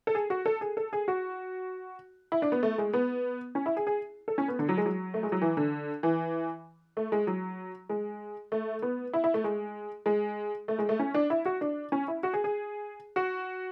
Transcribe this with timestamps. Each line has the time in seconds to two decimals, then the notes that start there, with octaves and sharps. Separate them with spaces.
0.07 A4
0.15 G#4
0.30 F#4
0.46 A4
0.61 G#4
0.77 A4
0.93 G#4
1.08 F#4
2.32 E4
2.42 D4
2.52 B3
2.63 A3
2.78 G#3
2.93 B3
3.55 C#4
3.66 E4
3.77 G#4
3.87 G#4
4.28 A4
4.38 C#4
4.48 B3
4.59 D3
4.69 F#3
4.78 G#3
4.86 F#3
5.14 A3
5.23 G#3
5.32 F#3
5.42 E3
5.57 D3
6.03 E3
6.97 A3
7.12 G#3
7.27 F#3
7.89 G#3
8.52 A3
8.82 B3
9.13 E4
9.24 E4
9.34 A3
9.44 G#3
10.06 G#3
10.68 A3
10.79 G#3
10.89 A3
10.99 C#4
11.14 D4
11.30 E4
11.45 F#4
11.61 D4
11.92 C#4
12.08 E4
12.23 F#4
12.33 G#4
12.44 G#4
13.16 F#4